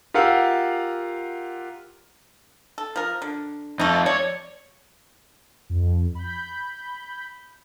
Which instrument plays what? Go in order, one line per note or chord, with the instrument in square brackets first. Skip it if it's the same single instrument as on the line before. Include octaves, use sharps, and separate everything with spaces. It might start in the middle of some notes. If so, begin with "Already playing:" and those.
[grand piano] F4 G4 A#4 F5 F#5 E6
[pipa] A4
F3 A#4
D3
[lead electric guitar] F2 [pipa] A3 D#4
[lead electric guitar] C#5 [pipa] D5
[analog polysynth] F2
B5 G6